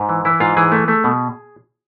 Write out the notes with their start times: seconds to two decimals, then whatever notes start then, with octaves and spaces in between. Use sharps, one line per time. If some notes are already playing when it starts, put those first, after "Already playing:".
Already playing: G#2
0.09 E3
0.25 E3 E4
0.40 G#2 F4
0.57 E3 G#4
0.72 A3
0.88 A3
1.04 B2